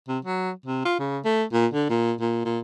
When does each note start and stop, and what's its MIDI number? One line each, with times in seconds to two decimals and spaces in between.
0.08 0.18 48
0.25 0.51 54
0.66 0.83 48
0.85 0.96 65
0.99 1.19 49
1.25 1.44 57
1.52 1.67 46
1.73 1.87 50
1.89 2.13 46
2.20 2.43 46
2.45 2.59 46